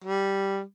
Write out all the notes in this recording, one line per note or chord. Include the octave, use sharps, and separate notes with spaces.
G3